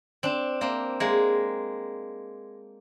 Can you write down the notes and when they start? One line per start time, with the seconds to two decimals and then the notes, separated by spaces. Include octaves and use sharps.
0.23 C4 D4
0.61 A#3 C4
1.00 G#3 A#3